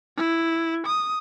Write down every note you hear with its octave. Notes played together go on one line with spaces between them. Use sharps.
E4
D#6